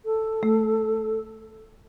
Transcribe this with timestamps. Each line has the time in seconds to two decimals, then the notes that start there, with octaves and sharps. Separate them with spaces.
0.05 A4
0.43 A3